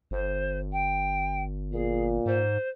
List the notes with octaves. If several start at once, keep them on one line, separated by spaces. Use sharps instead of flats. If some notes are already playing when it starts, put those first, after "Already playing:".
G1 C5
G5
A#2 G#4
G#2 C5